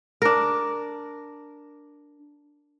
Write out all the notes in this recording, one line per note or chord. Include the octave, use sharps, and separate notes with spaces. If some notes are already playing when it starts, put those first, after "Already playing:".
D4 A#4